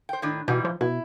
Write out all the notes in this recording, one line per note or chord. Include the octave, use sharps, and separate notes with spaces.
C5 G5
A2 D#3 D4
G#2 B2 E3 G3
F3
B2 E4